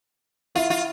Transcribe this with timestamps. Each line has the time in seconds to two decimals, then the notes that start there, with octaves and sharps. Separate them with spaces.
0.55 E4 F4 E5
0.70 F4